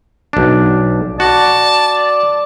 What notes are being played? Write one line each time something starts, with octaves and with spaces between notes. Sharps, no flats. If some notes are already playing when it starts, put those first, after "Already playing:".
B1 D4
F#4 D5 A5